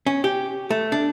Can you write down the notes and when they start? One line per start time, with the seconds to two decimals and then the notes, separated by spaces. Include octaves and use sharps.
0.07 C#4
0.24 G4
0.71 A3
0.92 D4